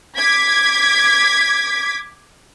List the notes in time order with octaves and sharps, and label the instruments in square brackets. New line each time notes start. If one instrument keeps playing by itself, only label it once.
[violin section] D6 G#6 B6